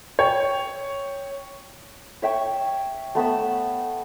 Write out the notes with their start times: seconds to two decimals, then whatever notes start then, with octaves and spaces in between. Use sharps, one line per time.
0.19 C#5 G5
2.22 C#5 E5 G5 C#6
3.15 A3 B3 B5 E6